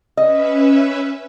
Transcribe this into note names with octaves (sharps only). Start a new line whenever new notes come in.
C#4 B4 D#5 E5